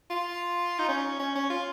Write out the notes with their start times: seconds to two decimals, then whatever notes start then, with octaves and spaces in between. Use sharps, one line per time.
0.10 F4
0.79 D#4
0.88 C#4
1.20 C#4
1.35 C#4
1.50 F4